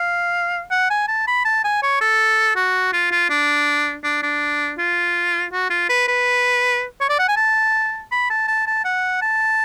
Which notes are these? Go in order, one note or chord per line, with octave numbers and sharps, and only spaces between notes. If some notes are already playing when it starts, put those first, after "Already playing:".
Already playing: F5
F#5
G#5
A5
B5
A5
G#5
C#5
A4
F#4
F4
F4
D4
D4
D4
F4
F#4
F4
B4
B4
C#5
D5
F#5
G#5
A5
B5
A5
A5
A5
F#5
A5